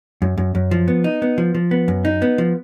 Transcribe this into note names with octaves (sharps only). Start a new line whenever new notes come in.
F#2
F#2
F#2
F3
B3
D#4
B3
F3
F3
B3
F#2
D#4
B3
F3